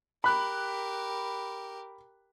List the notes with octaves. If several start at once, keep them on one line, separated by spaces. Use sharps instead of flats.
G4 A#4 B5 F#6